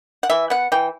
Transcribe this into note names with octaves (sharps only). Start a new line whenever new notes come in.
F#5
E3 E5
B3 F#5
E3 G5